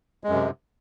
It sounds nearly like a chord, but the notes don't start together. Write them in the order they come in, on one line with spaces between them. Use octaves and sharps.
G#3 F#2 C3